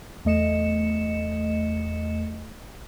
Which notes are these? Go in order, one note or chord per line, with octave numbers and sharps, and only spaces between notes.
E2 A3 D#5 C#7 E7